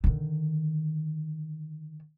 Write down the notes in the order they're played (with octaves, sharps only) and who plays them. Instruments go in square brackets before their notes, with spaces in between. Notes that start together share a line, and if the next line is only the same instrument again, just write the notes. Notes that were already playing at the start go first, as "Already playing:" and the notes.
[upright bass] D3 D#3